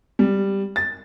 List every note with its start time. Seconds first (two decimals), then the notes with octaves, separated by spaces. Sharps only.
0.19 G3
0.76 A6